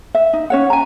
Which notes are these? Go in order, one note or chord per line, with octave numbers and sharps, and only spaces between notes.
E5
D#4
C#4 C#5 F#5
G#5 A#5